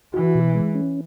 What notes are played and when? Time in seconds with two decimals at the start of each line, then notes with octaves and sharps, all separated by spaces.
0.14 E3 F#4
0.35 B2
0.55 G#3
0.75 C#4